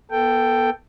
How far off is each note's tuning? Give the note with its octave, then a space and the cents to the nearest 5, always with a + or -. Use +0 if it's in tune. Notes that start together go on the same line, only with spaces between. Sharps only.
B3 -30 A4 +10 G5 +0